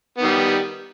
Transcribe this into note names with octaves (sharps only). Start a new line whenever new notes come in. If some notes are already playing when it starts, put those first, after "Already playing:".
D#3 G3 B3